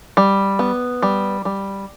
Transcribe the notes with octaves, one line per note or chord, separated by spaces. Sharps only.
G3
B3
G3
G3